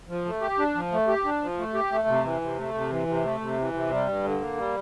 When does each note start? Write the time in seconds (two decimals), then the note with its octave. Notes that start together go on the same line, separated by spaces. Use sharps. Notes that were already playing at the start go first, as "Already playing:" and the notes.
0.08 F3
0.25 A3
0.41 G4
0.58 D4
0.75 F3
0.92 A3
1.08 G4
1.24 D4
1.42 F3
1.58 A3
1.74 G4
1.91 A3
2.08 C3
2.24 E3
2.41 C3
2.57 A3
2.74 C3
2.91 E3
3.08 C3
3.24 A3
3.41 C3
3.58 E3
3.74 C3
3.91 G3
4.07 G2
4.24 D3
4.41 A#3
4.57 G3